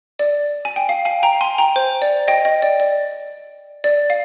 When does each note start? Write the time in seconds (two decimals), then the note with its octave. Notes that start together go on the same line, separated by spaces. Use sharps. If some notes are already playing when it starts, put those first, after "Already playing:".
0.19 D5
0.65 G#5
0.76 G5
0.89 F5
1.05 F5 G#5
1.23 G5 A#5
1.41 G#5 C6
1.58 G5 A#5
1.76 C5
2.02 D5
2.28 D#5 G5
2.45 D#5
2.62 D5
2.80 D5
3.84 D5
4.10 F5